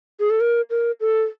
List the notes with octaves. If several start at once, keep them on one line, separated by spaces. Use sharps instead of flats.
G#4
A4
A#4
A#4
A4